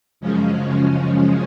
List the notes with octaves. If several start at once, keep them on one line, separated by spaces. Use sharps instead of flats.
F#2 C#3 F3 G#3 C#4